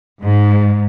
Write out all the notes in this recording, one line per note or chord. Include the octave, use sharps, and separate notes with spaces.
G#2